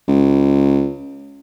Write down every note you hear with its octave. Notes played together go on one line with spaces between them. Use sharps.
C#2